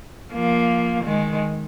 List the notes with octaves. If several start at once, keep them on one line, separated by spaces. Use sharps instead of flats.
F3 A#3
D#3 G#3